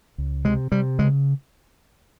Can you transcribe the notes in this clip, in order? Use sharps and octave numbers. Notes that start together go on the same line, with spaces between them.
C#2
C3 G#3
C3 G3
C#3 G#3